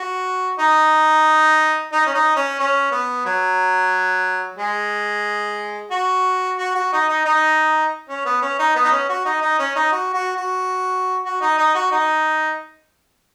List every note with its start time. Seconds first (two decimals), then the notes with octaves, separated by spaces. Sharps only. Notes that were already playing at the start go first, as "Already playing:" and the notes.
Already playing: F#4
0.59 D#4
1.92 D#4
2.06 C#4
2.15 D#4
2.36 C#4
2.59 C#4
2.91 B3
3.26 F#3
4.58 G#3
5.91 F#4
6.58 F#4
6.75 F#4
6.92 D#4
7.08 D#4
7.25 D#4
8.09 C#4
8.26 B3
8.42 C#4
8.59 D#4
8.75 B3
8.84 D#4
8.92 C#4
9.09 F#4
9.25 D#4
9.42 D#4
9.59 C#4
9.76 D#4
9.92 F#4
10.14 F#4
10.36 F#4
11.26 F#4
11.41 D#4
11.58 D#4
11.75 F#4
11.92 D#4